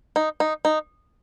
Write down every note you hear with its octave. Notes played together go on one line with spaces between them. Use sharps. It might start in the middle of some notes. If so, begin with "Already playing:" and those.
D#4
D#4
D#4